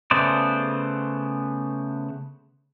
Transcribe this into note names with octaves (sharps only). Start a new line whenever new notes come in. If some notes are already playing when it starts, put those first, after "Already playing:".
C#3 A3 B3 C5 D5